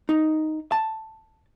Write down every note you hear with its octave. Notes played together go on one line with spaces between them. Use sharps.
D#4
A5